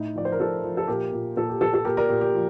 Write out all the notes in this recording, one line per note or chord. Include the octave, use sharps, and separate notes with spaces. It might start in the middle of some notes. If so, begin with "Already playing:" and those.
Already playing: A2 D#4
F3 D5
C5
A#4
F3 A4
F3
A4
A#2 G4 A#4
A#2
A#2 A4
G4
A#2 A4
A4
A#2 G4 A#4
A#4 D5
A#2 G4
G4
F3